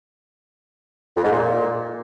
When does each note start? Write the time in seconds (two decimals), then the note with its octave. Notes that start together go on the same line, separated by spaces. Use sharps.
1.16 F2
1.24 G#2
1.32 A#2